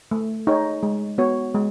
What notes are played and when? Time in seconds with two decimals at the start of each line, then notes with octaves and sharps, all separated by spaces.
0.11 A3
0.47 D#4 G#4 C#5
0.83 G#3
1.18 B3 F#4 C#5
1.55 G#3